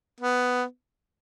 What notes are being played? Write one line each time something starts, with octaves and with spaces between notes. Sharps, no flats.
B3